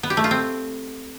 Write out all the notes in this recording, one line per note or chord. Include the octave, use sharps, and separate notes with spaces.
B3
G4
A3
F4
C4